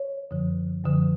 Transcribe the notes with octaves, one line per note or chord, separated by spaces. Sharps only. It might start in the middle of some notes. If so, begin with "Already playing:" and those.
Already playing: C#5
F#2 D3 F3
F#2 D3 F3